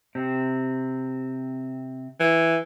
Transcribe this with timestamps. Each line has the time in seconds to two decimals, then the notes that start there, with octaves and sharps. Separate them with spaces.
0.15 C3 C4
2.20 E3